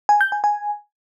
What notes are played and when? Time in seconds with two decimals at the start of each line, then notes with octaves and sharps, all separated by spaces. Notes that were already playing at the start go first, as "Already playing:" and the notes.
0.09 G#5
0.21 G6
0.32 G#5
0.44 G#5